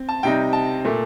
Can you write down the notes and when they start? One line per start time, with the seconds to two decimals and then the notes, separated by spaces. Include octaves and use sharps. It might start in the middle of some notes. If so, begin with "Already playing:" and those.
Already playing: C4
0.09 A5
0.23 C3 G3 C4 D#4 G5
0.53 A5
0.85 A#2 A3